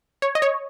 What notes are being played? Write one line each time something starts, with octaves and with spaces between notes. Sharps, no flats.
C#5
D#5
C#5